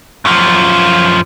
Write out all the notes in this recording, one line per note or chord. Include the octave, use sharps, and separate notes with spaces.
F#2 F3